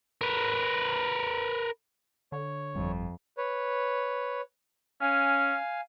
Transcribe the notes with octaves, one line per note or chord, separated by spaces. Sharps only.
A#4 B4
D3 C#5
G1 F2 G3
B4 C#5
C#4 F5 G#5